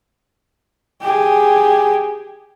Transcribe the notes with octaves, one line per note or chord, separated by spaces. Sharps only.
G4 G#4